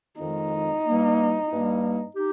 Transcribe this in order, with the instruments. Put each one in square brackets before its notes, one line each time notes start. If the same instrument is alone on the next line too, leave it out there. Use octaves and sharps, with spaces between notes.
[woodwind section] F2 D#3 G#3 [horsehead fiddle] D#4
[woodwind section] G2 G3 A#3
G2 G3 A#3
D#4 G4